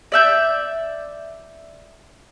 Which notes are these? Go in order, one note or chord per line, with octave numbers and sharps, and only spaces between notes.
D5 E5 G6